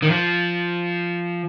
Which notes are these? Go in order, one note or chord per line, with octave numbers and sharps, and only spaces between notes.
D#3
F3